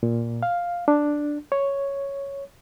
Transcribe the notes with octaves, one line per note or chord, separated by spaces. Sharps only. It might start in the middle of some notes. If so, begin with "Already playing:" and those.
A#2
F5
D4
C#5